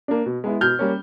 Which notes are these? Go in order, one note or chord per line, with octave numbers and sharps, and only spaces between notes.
A#3 D4
B2
G#3 B3 E4
B2 F6 G6
G3 A#3 C#4